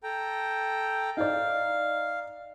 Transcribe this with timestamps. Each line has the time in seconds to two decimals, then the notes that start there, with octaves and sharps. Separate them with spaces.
0.03 A4 G5 A#5
1.17 D#4 D5 F5